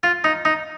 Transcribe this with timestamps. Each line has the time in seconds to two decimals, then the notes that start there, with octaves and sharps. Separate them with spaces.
0.03 F4
0.24 D#4
0.45 D#4